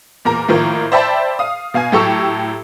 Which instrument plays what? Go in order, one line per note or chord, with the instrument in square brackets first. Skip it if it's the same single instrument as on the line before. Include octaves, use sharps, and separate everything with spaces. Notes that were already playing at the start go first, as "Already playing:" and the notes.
[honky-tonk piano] E2 A#2 A#4 A#5
A2 D#3 F3 A#3
C5 D5 E5 G5 A5 B5
F5 D#6
B2 F5 G#5 G#6
A2 F#3 G4 A4 C#6 E6